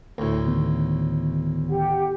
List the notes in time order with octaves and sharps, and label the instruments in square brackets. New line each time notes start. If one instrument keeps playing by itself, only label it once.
[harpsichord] D2 A2
[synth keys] D3 D#3 B3
[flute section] G4 F#5